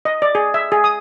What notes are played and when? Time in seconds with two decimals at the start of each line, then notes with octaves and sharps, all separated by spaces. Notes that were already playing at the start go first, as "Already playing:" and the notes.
0.05 D#5
0.22 D5
0.35 G#4
0.54 E5
0.72 G#4
0.84 D#6